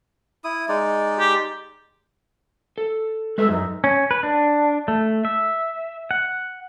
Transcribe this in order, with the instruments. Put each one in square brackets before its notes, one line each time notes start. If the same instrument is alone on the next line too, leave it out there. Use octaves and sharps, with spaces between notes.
[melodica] E4 D#6
G#3 D#4 D5
[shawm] G4
[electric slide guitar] A4
[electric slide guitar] G#3 B4 E5 [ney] A4
[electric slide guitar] F#2 [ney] D#4
[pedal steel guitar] C#4
B4
D4
A3
E5
F#5